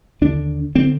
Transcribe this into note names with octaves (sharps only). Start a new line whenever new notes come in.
D#2 D3 D4
D3 C4